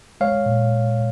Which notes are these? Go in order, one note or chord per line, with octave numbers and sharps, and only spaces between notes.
G#3 C#5 F5
A#2